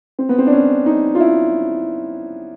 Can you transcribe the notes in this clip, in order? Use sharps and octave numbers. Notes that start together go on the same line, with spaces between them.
C4
B3
C4
D4
C#4
D#4
F4
E4